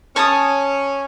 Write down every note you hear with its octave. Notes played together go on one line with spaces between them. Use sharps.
C#4 C#5 A5 D#6